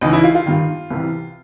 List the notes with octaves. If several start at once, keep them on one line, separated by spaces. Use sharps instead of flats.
C#2 C#3 E3 D#4
E4
F4
F4
G2 D#3
C2 C3 E3